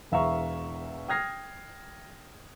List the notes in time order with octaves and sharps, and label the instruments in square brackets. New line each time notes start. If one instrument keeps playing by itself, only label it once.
[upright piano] E1 E2 E5 F5 A#5 C#6
G5 D#6 F6 G#6 A#6 C7